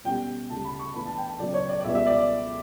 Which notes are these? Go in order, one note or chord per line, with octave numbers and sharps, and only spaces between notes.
B2 G3 C#4 G5
D2 C#3 G3 A5
B5
C#6
A2 E3 B3 D4 B5
A5
G5
A5
C#3 F#3 B3 D5
C#5
D5
D5
C#2 B2 G3 B3 E5
E5
D5